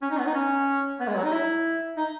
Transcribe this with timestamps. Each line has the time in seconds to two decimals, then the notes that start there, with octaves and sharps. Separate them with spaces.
0.02 C#4
0.11 D#4
0.18 B3
0.26 D#4
0.34 C#4
1.00 B3
1.08 G#3
1.16 F#3
1.24 D#4
1.32 E4
1.97 D#4